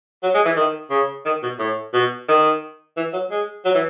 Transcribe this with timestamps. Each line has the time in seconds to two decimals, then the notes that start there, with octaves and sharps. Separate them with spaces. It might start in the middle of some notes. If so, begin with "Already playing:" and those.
0.23 F#3
0.34 G#3
0.45 E3
0.56 D#3
0.90 C#3
1.26 D#3
1.43 B2
1.59 A2
1.93 B2
2.28 D#3
2.97 E3
3.13 F#3
3.31 G#3
3.65 F#3
3.75 E3